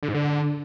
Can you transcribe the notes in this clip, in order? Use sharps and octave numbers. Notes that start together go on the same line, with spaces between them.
D3
G#2
D3